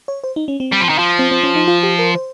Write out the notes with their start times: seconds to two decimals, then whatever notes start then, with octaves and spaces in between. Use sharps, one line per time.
0.08 C#5
0.24 C5
0.36 D#4
0.48 C#4
0.60 C4
0.72 G3
0.80 F3
0.89 D#3
0.98 F3
1.19 C4
1.31 C4
1.43 C#4
1.56 D#4
1.68 F4
1.83 G4
1.99 A#4
2.15 C5